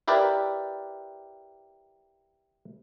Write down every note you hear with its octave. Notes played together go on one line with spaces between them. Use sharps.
E4 G4 A#4 B4 D5